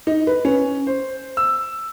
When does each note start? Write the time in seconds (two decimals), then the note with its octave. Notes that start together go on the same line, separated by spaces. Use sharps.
0.07 D#4
0.27 B4
0.45 C#4
0.87 C5
1.37 E6